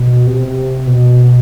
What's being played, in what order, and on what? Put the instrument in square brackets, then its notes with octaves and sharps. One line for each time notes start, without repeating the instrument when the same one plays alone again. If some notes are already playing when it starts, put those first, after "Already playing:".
Already playing: [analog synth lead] B2
C3
B2